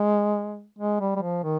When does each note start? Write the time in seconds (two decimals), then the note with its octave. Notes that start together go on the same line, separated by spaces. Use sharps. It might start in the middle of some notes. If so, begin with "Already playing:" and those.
Already playing: G#3
0.79 G#3
1.00 G3
1.16 G3
1.22 F3
1.43 D#3